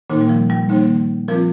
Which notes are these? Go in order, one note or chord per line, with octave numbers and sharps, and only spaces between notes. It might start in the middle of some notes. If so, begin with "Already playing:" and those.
A#2 D#3 A#3 D#4
G3
F3
G3
D#3 A#3 D#4
F3 C4 F4 A#4